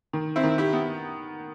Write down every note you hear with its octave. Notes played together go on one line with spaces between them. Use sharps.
D#3
C4 E4
D#3
E4 G4
B3